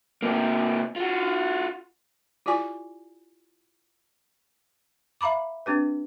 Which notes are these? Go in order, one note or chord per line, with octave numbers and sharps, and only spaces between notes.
C3 A#3
F4 F#4
E4 F4 G4 D5 G#5 C#6
E5 F5 A#5 B5 D6
C4 D4 G4 B4